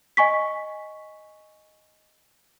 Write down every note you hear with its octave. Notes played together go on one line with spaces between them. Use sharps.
D#5 G#5 C#6 B6